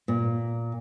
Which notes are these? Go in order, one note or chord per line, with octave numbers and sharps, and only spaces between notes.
A#2